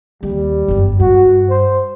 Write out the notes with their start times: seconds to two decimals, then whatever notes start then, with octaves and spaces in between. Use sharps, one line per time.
0.23 D#2 G3
0.68 G1 F#2
1.00 G2 F#4
1.50 C5